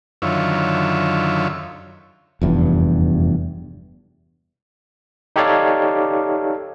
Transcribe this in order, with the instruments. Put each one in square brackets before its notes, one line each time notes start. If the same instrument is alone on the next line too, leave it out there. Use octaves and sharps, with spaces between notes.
[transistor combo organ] F#2 D3 D#3 F4 C#5 E5
[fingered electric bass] F1 E2 G2
[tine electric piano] D#4 G4 A4 C#5 D5 F5